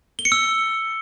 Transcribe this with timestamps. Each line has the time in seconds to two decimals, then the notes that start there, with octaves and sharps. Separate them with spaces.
0.19 G7
0.25 C#7
0.32 E6